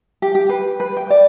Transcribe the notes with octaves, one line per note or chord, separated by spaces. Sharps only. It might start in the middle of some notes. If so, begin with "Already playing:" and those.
G4
G4
B4
B4
G5
D5